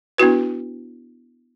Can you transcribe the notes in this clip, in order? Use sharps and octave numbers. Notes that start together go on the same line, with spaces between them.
B3 D4 E4 F#4 B4